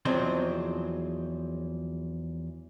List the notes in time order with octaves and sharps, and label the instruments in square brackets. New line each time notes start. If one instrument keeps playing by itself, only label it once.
[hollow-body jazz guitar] E2 F3 F#3 G#3 C4 C6